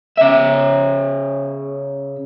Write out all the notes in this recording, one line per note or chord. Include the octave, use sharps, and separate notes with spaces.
C#3 E5